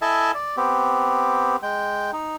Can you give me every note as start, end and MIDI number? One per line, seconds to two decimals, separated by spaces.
0.02 0.31 64
0.02 0.31 69
0.02 0.31 75
0.02 0.31 76
0.02 0.31 80
0.02 0.31 81
0.35 0.56 74
0.57 1.56 59
0.57 1.56 60
0.57 1.56 67
1.63 2.11 56
1.63 2.11 79
2.13 2.36 63